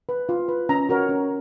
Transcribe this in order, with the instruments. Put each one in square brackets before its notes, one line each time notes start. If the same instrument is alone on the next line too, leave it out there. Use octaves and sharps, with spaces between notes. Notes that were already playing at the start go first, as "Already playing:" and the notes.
[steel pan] B4
F4
B4
C#4 A#5
F#4 A#4 C#5
C#4